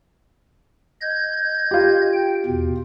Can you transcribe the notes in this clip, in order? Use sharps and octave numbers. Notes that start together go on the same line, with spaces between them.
D#5 G6 G#6
F4 G4
G5
E2 B2